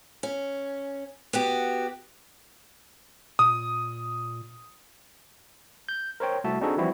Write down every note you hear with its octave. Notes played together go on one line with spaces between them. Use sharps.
C#4
B3 F#4 G4
A#2 D#6
G6
A#4 C5 C#5 G5
C2 A3 F#4 E5 A5
C4 D4 D#4 F#4 G#4 A4
E3 F3 G3 C4 E4 F#4